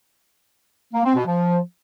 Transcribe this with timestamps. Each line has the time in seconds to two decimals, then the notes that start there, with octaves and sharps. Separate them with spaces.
0.94 A#3
1.05 C4
1.16 B2
1.27 F3